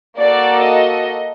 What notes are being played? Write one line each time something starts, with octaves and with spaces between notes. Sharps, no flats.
A#3 F#4 A4 D5
D#5